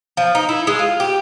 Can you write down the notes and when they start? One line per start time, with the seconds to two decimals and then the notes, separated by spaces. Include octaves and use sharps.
0.17 F3
0.35 D#4
0.49 E4
0.67 G#3
0.79 F4
1.00 G4